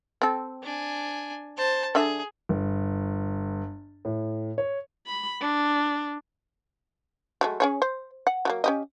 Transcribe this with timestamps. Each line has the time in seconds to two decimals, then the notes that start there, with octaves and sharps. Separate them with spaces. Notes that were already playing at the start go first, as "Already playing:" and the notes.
0.22 C4 A4
0.63 D4 G#5
1.57 C5 A5
1.95 D3 D4 G#4 E5
2.49 G1
4.05 A2
4.58 C#5
5.07 B5
5.41 D4
7.41 F#3 G#3 A3
7.60 C#4 G#4 C#5
7.82 C5
8.27 F#5
8.45 F#3 A3 A#3
8.64 C#4 G4 D#5